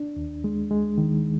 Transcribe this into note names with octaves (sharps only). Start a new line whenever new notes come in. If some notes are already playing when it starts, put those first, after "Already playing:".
Already playing: D4
D#2
G#3
G#3
D#3